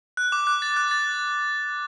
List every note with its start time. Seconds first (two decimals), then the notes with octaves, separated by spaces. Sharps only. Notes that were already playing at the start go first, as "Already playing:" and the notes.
0.17 F#6
0.32 D6
0.47 F#6
0.62 A6
0.77 F#6
0.91 A6